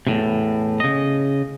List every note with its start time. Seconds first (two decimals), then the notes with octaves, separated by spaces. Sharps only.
0.07 E2 A2 C3
0.80 C#3 D#5